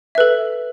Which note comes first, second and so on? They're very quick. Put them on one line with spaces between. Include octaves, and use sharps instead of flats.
E5 B4 A4